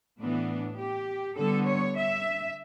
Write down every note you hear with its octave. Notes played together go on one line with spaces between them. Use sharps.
A2 E3 B3 D4
G4
D3 G3 B3 A4
C#5
E5